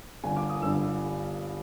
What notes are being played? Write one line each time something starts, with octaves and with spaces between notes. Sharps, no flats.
G1 G2 D3 G#5
D6
D#6
G1 G2 D3 E6